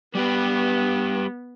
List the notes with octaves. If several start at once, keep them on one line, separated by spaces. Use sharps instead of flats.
G3 B3 G4 B4